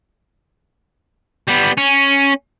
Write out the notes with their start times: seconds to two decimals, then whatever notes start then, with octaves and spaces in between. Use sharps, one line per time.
1.48 G3 B3
1.78 C#4